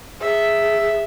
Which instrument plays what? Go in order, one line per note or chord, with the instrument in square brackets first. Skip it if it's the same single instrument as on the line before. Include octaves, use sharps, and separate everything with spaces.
[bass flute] G#4 [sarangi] E5